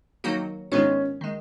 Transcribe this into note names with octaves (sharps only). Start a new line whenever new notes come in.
D#3 F#3 A#3 D#4 F#4
G#2 D#3 G#3 B3 C#4 F4
D#3 G#3